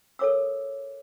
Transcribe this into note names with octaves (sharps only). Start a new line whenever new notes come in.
A4 A#4 C#5 D6 E6